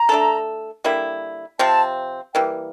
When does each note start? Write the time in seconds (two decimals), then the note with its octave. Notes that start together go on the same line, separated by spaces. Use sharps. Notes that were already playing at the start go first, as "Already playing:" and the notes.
Already playing: A#5
0.09 A3 D4 A4
0.84 D3 G3 A#3 E4
1.59 C3 F3 C4 A5
2.34 E3 G3 A#3 G5